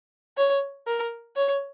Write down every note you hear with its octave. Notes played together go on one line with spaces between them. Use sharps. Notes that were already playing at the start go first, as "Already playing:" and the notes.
C#5
A#4
C#5